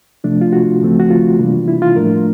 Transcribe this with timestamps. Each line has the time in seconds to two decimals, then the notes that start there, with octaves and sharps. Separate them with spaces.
0.24 C3 F3 A3 D4
0.41 F4
0.53 F#4
0.82 D2 C#3 F3 A3 C4
1.00 F#4
1.10 F4
1.39 C3 E3 G3 A#3 D4
1.68 E4
1.82 F4
1.96 A2 F3 A3 D4 A#4